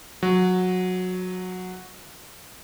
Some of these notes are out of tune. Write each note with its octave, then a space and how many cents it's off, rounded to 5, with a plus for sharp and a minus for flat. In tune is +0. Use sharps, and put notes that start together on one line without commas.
F#3 -15